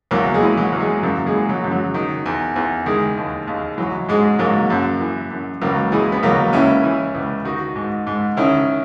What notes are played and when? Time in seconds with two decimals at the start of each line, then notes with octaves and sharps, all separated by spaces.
0.11 E2 F#3 A#3
0.34 G#3
0.42 E3
0.57 F#3
0.72 E2
0.80 G#3
1.03 F#2 F#3 A#3
1.26 G#3
1.34 E3
1.49 F#3
1.64 F#2
1.71 F#3
1.94 D#3
2.26 E2
2.56 E2
2.86 D#3 G#3
3.17 D#2
3.48 D#2
3.78 E3 F#3
4.09 G#2 G#3
4.39 G#2 F#3 A#3
4.70 F#2
5.00 E3
5.31 F#2
5.62 C#2 F#3 A#3
5.92 E3 G#3
6.12 B3
6.23 C#2 F#3 A#3
6.53 C#2 C#4 E4
6.83 E3
7.15 C#2
7.45 D#3 D#4 F#4
7.76 G#2
8.07 G#2
8.37 D#3 C#4 E4